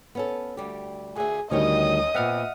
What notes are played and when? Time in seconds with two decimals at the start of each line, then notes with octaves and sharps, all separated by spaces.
0.15 B3 C#4 A4
0.57 D2 G3 G4
1.16 D2 G#4 E5
1.51 D2 D#3 G3 C#4 C#5 D#5 G5 D#6
2.15 A#2 B3 C4 E5 F#5 F6